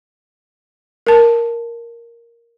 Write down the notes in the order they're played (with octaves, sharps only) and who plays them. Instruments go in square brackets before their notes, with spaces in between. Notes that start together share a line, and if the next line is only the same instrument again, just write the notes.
[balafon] A#4 A5